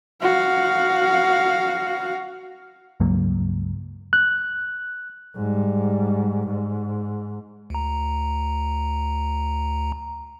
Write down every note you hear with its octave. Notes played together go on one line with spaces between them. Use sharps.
F#4 F5
C#2 G2 F#3 A#3
F#6
G#2 G3
G#2
D2 A#5